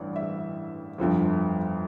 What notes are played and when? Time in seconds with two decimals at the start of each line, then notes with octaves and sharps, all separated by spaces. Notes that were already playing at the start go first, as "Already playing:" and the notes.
Already playing: A1 G2 E3 D5
0.16 E5
0.98 G1 F2 D3 F3